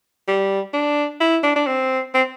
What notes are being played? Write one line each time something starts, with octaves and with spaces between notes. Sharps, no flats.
G3
D4
E4
D4
D4
C4
C4